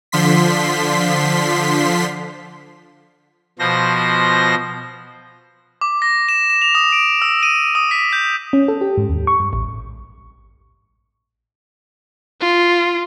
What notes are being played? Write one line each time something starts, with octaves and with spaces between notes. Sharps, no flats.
D3 F3 C6 B6
B2 F3 C5 A#6
D6
A#6
E7
E7
F7
D#6
D7
E6
D#7
D#6
B6
G6
C#4
A4
G4
G#2
D#2
C#6
G2
A1
F4